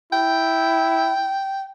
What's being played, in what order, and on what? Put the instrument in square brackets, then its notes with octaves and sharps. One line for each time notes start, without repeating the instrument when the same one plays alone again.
[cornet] E4 [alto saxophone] G5